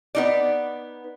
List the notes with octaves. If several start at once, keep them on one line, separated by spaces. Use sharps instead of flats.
B3 D#4 D5